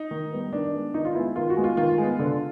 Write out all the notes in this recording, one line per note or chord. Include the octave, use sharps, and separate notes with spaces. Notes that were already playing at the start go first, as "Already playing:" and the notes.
Already playing: D#4
D#3
G3 B3
D#3 D4
G#3 B3
D#3 D#4
F4
G#3 B3 E4
D#3 F4
F#4
G#3 B3
F4
D#3 F4
G#3 B3
D3